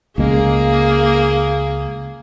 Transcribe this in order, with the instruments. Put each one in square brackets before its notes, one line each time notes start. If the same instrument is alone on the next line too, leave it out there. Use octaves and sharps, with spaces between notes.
[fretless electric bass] C#2 G#3 [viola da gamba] A#3 G#4